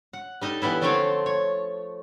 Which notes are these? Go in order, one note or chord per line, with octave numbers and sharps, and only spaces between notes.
F#5
G3 D#4 A4 D#5
E3 G3 B3 E4
D3 F3 A3 C4 F4 C#5
C#5